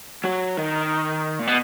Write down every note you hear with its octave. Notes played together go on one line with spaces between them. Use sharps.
F#3
D#3
A#2
B2